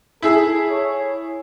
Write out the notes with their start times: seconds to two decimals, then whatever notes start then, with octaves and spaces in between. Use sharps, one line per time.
0.22 E4 G#4 A4 E6
0.70 C#5